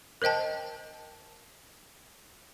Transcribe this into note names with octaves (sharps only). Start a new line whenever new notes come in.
A#4 C5 D#5 G5 A5